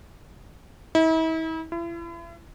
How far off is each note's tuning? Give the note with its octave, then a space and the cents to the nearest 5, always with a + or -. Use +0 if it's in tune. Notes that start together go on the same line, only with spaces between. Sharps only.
E4 -40
E4 +40